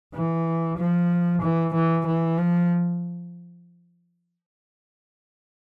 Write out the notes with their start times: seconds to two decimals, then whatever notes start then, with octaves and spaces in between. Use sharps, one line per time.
0.14 E3
0.78 F3
1.42 E3
1.74 E3
2.07 E3
2.38 F3